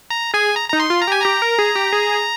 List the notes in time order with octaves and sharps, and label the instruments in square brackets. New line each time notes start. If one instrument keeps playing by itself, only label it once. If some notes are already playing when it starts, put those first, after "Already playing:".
[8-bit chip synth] A#5
[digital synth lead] G#4 [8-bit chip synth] G#5
[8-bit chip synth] A#5
[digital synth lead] D#4 [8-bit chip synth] A#5
[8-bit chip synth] C6
[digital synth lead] F4
[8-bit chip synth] A#5
[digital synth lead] G4 [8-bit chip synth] G#5
[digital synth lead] G4 [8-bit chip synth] A#5
[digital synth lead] A#4
G#4
G4
G#4